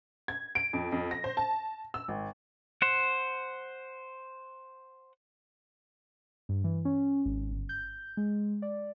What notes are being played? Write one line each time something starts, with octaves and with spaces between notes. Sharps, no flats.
G#6
D7
F2
F2
A#6
C5
A5
E6
G#1
C5 F#5
G2
E3
C#4
G#1
G1
G6
G#3
D5